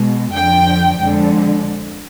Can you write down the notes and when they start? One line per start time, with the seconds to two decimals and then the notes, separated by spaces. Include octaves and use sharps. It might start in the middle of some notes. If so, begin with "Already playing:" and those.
Already playing: B2 G#3
0.33 F2 D3 F3 G5
0.98 F2 D3 G#3